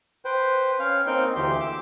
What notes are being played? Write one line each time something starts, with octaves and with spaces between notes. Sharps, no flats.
B4 C5 G5
C#4 F5
A#3 C4 D#4 G5
D2 E3 G4 C6
D6 E6